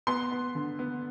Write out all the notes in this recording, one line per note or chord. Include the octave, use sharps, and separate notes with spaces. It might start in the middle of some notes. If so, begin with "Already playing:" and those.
B3 C6
B3
D3
B3